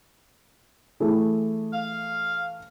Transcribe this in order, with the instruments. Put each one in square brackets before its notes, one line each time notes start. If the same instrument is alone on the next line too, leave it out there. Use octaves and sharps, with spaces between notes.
[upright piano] E3 A3 G#4
[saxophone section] F5